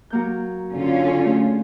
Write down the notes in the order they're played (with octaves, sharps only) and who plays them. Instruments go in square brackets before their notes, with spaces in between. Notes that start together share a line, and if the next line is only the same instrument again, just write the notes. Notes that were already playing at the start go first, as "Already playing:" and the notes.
[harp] F#3 A#3 G6
[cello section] D3 C#4 F4
[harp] A3 G#4